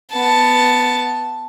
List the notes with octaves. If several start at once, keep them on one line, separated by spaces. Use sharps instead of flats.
B3 A5